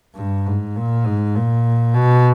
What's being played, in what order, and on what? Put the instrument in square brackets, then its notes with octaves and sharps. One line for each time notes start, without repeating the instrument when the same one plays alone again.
[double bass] G2
G#2
A#2
G#2
A#2
B2